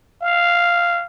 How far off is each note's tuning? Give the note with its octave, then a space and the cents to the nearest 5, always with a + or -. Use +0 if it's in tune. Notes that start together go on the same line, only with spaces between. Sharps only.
F5 -5